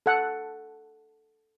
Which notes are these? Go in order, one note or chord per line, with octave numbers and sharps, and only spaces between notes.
A4 F#5